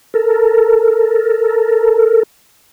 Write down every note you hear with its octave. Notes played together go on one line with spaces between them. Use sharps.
A4 A#4